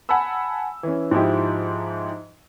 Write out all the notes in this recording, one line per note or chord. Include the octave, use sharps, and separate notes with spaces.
F#5 G#5 A5 B5 E6
E3 C#4
G#2 F3 D#4 E4 G4